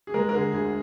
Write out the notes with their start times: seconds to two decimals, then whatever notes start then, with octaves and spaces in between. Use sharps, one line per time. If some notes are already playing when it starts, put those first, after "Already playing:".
0.07 G#4
0.14 G#3 A#4
0.29 A#4
0.34 D3 G#4
0.52 D2 G#4